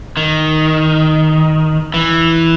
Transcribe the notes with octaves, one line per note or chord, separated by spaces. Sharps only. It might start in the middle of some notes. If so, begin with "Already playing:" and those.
D#3
E3